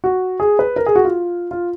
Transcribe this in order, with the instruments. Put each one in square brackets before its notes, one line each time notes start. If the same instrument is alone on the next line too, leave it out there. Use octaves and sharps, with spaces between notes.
[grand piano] F#4
G#4
B4
A#4
G#4
F#4
F4
F4